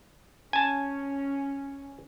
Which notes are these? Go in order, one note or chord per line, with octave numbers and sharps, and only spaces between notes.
C#4 G#5 A5